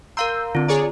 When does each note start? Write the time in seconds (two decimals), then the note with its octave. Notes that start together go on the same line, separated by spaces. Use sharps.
0.17 A#4 F5 A#5 C6 E6 G6
0.55 D3 C4 F4
0.68 G#4 C#5 D5 A#5